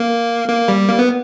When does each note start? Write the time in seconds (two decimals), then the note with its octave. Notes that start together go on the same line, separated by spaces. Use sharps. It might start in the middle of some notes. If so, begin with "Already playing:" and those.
Already playing: A#3
0.49 A#3
0.68 G3
0.89 A#3
0.99 B3